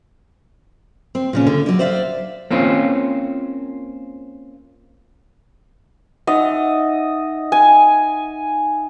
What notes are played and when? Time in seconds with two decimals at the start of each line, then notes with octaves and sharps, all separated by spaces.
1.15 C4
1.33 A#2 C#3 C#4
1.47 D3
1.66 F#3 D5
1.79 C5 D5 E5 F5
2.51 A#3 C4 C#4 F4
6.27 D#4 D#5 E5 F#5
7.52 G#5